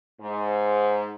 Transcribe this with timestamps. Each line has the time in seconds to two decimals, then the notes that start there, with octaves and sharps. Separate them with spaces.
0.21 G#2